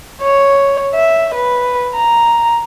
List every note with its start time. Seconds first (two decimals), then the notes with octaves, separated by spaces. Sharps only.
0.22 C#5
0.94 E5
1.34 B4
1.96 A#5